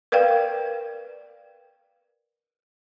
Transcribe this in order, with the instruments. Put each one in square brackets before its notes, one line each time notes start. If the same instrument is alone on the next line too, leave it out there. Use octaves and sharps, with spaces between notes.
[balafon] A#4 B4 D5 F5 G5